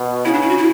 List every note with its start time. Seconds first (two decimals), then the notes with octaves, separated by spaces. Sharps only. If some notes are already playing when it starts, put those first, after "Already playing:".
Already playing: B2
0.25 C#3 E4
0.34 D4
0.42 E4
0.49 F#4
0.58 E4